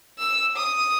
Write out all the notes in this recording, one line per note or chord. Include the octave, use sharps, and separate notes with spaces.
E6
D#6